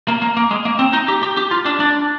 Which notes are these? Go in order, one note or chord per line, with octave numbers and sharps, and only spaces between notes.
A#3
A#3
A#3
G#3
A#3
C4
D#4
G4
G4
G4
F4
D4
D4